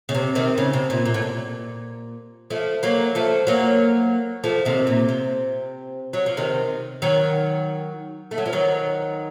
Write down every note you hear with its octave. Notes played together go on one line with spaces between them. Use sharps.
C#3
C3
C3 D#3
C#3
C3
A#2
A#2
A2
A#2
F3 A3
F#3 A#3
F3 A3
F#3 A#3
F3 A3
C3 D#3
A#2
C3
F#3
F3
C3 D#3
D#3 F#3
A3
F#3
F3
D#3 F#3